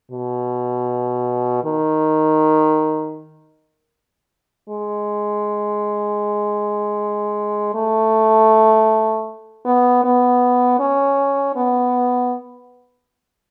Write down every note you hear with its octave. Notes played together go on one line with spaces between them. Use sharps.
B2
D#3
G#3
A3
B3
B3
C#4
B3